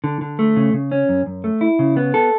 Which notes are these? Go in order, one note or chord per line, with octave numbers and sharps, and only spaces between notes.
D3
D3
A3
C#3
C#3
C#4
F#2
F#2
A3
E4
C#3
B3
A4